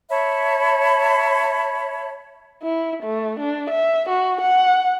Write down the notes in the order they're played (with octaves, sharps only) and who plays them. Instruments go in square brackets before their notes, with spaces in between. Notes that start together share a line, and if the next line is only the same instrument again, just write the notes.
[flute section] C#5 E5 A5 B5
[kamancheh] E4
A3
D4
E5
F#4
F#5